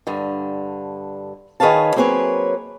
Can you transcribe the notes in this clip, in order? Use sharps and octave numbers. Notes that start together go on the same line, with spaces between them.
G2 D3
D#3 G#4 B4 C#5 F5 A5
F#3 A#3 C4 G#4 B4 C#5